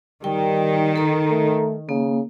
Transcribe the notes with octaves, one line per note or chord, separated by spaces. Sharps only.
D#3 G3 G5
A4 A#5
A3
C#3 A#3